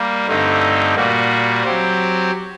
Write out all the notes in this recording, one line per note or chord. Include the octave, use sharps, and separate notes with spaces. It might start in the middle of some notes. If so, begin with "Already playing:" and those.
Already playing: G3 A#3
G2 D3 A3 C4 D#4
A#2 G3 A#3 F#4
F#3 C4 G4 C5